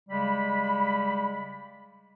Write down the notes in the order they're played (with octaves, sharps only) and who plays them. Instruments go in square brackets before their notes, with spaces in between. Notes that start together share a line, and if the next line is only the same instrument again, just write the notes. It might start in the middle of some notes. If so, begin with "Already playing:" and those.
[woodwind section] C#3 G3 G#3 B5